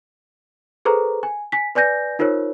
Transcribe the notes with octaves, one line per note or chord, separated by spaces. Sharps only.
G#4 A4 B4 C5 A#5
G#5
G#5 B6
B4 D5 G#5 G6 A#6
D#4 F4 A#4 C5 C#5